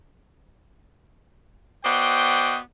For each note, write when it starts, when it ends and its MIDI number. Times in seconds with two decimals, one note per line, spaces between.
1.85 2.59 59
1.85 2.59 66
1.85 2.59 72
1.85 2.59 74
1.85 2.59 75
1.85 2.59 79